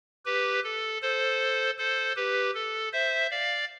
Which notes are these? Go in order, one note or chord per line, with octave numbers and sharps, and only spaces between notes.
G4 B4
A4
A4 C5
A4 C5
G4 B4
A4
C5 E5
D5 F5